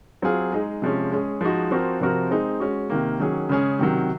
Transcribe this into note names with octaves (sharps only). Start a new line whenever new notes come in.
F#3 C4 F4 G#4
G#3 D#4 G#4
C3 F3 G#3 C#4
G#3 C#4 G#4
F3 G#3 D#4 F#4
F3 C4 F#4 A#4
C3 F3 C4 F#4 A#4
G#3 C4 D#4 G#4
G#3 C#4 F#4
C3 D#3 A#3
D#3 F#3 C#4 G#4
C#3 G#3 C#4 G#4
C3 D#3 F#3